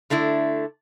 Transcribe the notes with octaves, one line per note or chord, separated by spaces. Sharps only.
D3 A3 D4 E4